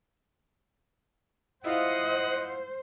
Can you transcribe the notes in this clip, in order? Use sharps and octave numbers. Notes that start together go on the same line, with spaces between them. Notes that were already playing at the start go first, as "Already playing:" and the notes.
E4 F4 C5 D#5 F5 F#5